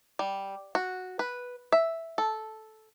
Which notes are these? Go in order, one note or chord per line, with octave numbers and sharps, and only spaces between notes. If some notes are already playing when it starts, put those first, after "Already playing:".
G3
F#4
B4
E5
A4